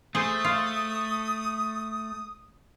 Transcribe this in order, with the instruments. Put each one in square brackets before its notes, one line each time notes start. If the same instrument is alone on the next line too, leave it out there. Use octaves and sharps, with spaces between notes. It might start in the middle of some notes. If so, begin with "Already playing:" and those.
[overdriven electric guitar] A3 [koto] G#4 C5 [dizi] D#6
[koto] F4